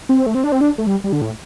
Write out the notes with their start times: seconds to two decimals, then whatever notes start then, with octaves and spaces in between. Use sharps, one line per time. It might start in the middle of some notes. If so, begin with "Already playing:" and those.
0.09 C4
0.26 A3
0.35 C4
0.44 D4
0.52 C4
0.61 D4
0.78 A3
0.87 G3
1.04 G3
1.13 D3
1.22 A2